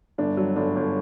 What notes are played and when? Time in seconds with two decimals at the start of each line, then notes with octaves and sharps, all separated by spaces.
0.18 G1 D4
0.37 F#3
0.56 G1 D4
0.76 G1